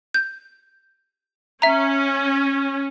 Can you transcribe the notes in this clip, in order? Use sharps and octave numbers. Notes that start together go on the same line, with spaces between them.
G6
C#4 E5 A#5